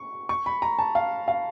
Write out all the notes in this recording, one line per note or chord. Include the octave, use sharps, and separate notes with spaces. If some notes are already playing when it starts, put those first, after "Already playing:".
Already playing: C#6
C#6
B5
A#5
A5
F5
F5